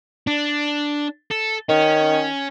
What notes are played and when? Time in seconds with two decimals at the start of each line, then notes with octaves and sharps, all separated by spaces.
0.27 D4
1.31 A4
1.69 D#3 C#4